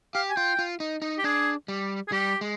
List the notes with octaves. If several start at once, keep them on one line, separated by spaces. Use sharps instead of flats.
G4 F5
G#5
F4 G5
F4
D#4
D#4
G4
D4 G#4
G3
G#4
G3 G4
G#3